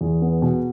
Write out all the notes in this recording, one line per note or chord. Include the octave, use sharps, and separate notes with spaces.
E2 G#4
B3
B2